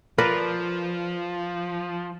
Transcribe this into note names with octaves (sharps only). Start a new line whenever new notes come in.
F3 A#4 B4 D5